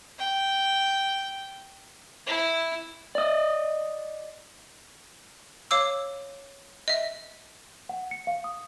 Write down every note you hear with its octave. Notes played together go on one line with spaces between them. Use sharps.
G5
E4
D5 D#5
C#5 F5 D6 E6
D#5 E5
F#5
C#7
F5
D#6